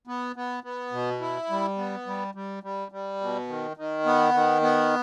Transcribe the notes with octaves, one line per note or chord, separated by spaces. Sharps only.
B3
B3
B3
B2
E4
G3
B3
G3
G3
G3
G3
B2
D#3
D#3
B3
D#3
B3